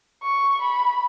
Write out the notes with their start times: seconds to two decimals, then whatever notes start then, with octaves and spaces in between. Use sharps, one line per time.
0.23 C#6
0.61 B5